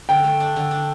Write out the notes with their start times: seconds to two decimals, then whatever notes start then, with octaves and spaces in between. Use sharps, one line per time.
0.09 D3 G5
0.24 A3
0.40 D4
0.56 D3
0.71 D4